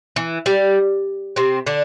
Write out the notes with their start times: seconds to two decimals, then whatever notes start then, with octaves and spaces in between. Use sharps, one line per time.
0.16 E3
0.46 G3
1.36 C3 C4
1.67 D3 D4